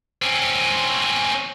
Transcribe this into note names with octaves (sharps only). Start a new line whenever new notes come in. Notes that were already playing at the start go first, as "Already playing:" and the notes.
C4 C#4